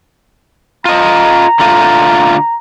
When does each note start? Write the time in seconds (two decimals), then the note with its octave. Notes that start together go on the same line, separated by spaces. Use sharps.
0.85 F4 D#5 A#5
1.59 D3 A3 F4